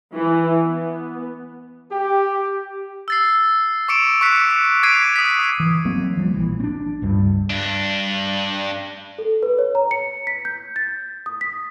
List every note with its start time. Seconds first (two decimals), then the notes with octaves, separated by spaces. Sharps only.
0.14 E3
0.62 B3
1.91 G4
3.08 E6 A6 C7
3.88 C#6 D6 C#7 D7 E7
4.21 C#6 D6 F#6 B6 C#7
4.83 D6 G#6 B6 C7 D7 D#7
5.16 D#6 B6
5.60 E3
5.85 F#3 A#3 C4
6.17 F3 G3 A#3
6.34 A#1 E3
6.60 C4 D4
7.02 C#2 G2 G3
7.50 G2 D4
9.18 A4
9.43 B4
9.58 C#5
9.75 A#5
9.91 C#7
10.27 B6
10.45 G6
10.76 A6
11.26 D#6
11.41 B6